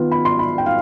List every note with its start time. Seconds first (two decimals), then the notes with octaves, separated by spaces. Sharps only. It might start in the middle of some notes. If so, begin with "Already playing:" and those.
Already playing: D#3 B3 F4
0.12 B5
0.25 C6
0.39 B5
0.58 G5
0.66 F5